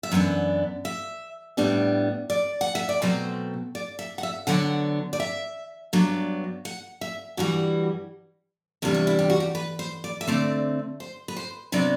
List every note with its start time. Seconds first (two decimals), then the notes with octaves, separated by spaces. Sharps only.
0.03 E5
0.12 F#2 E3 B3 D4 F#5
0.85 E5
1.57 A2 G3 B3 D4
2.30 D5
2.61 F#5
2.75 E5
2.89 D5
3.02 B2 F#3 A3 C4 C5
3.75 D5
3.99 E5
4.18 F#5
4.23 E5
4.47 D3 F#3 B3 D4 F#5
5.13 D5
5.20 E5
5.93 G2 F#3 B3 D4
6.65 F#5
7.01 E5
7.37 G2 E3 G3 F#4
8.82 E2 C3 G3 D4 E4
8.94 F#4
9.07 E4
9.19 G4
9.30 F#4
9.40 G4
9.55 B4
9.79 C5
10.04 D5
10.21 E5
10.27 D3 A3 C4 D5
11.00 C5
11.28 B4
11.37 C5
11.72 C3 F#3 B3 D4 D5